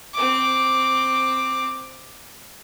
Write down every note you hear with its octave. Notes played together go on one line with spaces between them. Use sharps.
C4 D6